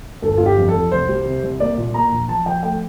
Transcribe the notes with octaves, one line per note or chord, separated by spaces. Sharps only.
G1 A4
G1 F4
G4
F2
A4
F2
C2 C5
G3
C3
C2
A#3 D5
A#2
A#3 A#5
A#1
F3 A5
F3 G5
A3 G5